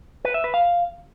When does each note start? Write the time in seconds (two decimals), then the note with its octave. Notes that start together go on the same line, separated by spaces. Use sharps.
0.25 B4
0.34 E5
0.44 B4
0.54 F5